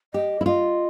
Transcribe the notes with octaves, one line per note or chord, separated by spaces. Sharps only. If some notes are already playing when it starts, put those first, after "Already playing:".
G4 D#5
E4
F4 D#5